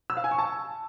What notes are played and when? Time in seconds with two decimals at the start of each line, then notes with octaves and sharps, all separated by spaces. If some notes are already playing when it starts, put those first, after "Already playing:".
0.10 E6
0.17 F5
0.24 G#5
0.31 C#6
0.38 A5